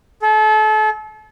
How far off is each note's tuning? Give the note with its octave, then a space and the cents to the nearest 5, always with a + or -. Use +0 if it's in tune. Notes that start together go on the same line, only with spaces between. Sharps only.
A4 -35